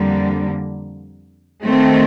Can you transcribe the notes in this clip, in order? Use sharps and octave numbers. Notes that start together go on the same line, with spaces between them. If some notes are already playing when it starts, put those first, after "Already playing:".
Already playing: F2 D3 G3 A#3
D#3 A3 C4